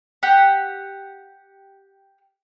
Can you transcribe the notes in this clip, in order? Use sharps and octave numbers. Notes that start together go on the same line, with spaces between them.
G4 F#5